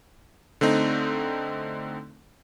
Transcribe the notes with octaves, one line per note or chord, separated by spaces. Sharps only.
D3 A3 C4 D#4